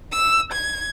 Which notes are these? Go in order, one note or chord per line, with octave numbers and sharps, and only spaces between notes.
E6
G#6